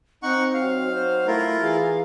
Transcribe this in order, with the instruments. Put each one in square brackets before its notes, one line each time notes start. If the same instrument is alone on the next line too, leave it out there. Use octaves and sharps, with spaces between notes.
[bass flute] C4 [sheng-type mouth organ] D#4 F#5 C#6
[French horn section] F#3 D#4 F#4 [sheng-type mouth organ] F5
[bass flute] C5
[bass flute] A3 [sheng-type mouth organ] E4 F4 A#4
[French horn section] E3 G#4 [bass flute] F5